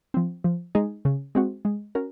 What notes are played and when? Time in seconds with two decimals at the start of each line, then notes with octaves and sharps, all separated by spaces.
0.14 F3 C4
0.44 F3
0.75 G#3 D#4 G#4
1.05 C#3
1.35 G#3 C4 F#4
1.65 G#3
1.95 C#4 F#4 A#4